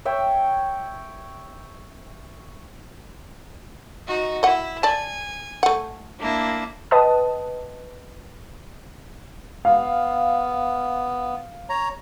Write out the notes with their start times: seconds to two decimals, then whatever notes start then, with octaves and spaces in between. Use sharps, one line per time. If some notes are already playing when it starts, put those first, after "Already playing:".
0.05 C#5 E5 G5
4.07 D#4 F#4
4.43 E4 D#5 F#5
4.83 D5 G#5 A5
5.63 A3 F#5
6.19 A#3 D4 E4
6.91 B4 D#5 G5 A5 D#6
9.65 B3 F5
11.69 C#5 A#5